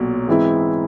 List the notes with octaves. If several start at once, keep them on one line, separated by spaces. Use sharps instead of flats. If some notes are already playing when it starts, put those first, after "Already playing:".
Already playing: B1 A#2 F#3
G#2 E3 G#3 C4 E4